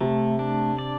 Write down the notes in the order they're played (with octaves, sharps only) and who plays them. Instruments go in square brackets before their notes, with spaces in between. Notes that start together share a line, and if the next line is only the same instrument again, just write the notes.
[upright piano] C3 [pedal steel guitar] A3
[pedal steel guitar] D4
D5